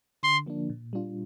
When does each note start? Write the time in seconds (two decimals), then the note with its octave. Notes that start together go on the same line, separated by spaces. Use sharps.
0.23 D3 C6
0.46 F3 A#3 D4
0.70 A#2
0.93 G3 D4 F4